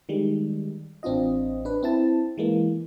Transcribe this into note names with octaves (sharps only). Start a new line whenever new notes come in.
D#3 G3 G#3
A1 C4 D4 F4 D#5
D4 B4
C4 E4 A5
E3 G#3 A#3